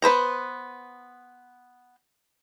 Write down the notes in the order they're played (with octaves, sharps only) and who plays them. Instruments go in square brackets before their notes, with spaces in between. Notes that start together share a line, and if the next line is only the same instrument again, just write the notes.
[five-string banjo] B3 B4 C5 A#5